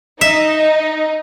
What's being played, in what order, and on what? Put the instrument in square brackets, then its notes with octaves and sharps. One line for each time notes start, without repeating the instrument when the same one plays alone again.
[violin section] D#4 [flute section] D#5 [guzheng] E5